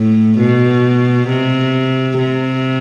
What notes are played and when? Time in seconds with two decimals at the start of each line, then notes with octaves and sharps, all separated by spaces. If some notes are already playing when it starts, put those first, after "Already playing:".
Already playing: A2
0.38 B2
1.28 C3
2.17 C3